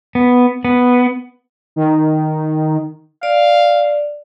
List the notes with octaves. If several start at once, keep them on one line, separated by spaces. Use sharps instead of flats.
B3
B3
D#3
D5 F5